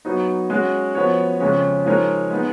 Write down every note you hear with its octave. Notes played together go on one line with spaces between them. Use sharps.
F#3 B3 D#4
G#3 C#4 F#4
F3 B3 F#4 C#5
F2 C#3 G#3 C#4
F3 G#3 D#4 A#4 C#5
G#3 B3 D#4